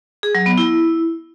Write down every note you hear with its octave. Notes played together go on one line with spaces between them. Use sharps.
G#4
F#3
B3
E4